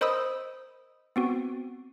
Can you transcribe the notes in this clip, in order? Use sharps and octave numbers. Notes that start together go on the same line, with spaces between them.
A#4 C5 D#5 B5 D#6 E6
B3 C4 F#4